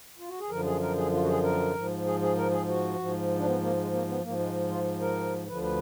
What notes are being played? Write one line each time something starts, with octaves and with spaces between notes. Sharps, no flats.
F4
F#4
G#4
F#2 D3 F3 A#4
G#4
A#4
G#4
F4
F#4
G#4
A#4
G#2 F3
G#4
G#4
A#4
G#4
F#4
G#2 F3
D4
B3
A#3
G#3
A#3
B3
G#2 F3 A#3
G#3
F4
A#4
D2 D3 F3 B4
B4